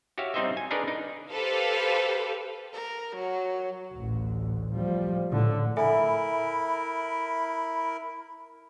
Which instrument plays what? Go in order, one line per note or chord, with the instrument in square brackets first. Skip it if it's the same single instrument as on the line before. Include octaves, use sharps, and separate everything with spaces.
[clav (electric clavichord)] F#4 G4 C#5 E5 F5
G3 C4 D#4 C5 D#5 E5
G#5
D4 D#4 G#4 A#4 B4 D5
D#4
[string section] G4 A4 B4 C5 F5
[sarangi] A#4
F#3
[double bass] A1 D2
F3 G3
A2 D3
[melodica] E4 A#4 [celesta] A4 E5 G#5 [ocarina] B5